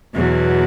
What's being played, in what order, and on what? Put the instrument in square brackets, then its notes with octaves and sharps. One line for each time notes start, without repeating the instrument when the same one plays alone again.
[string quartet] E2 B2 F#3